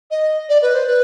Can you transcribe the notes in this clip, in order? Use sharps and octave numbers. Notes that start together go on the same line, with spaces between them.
D#5
D5
B4
C5
B4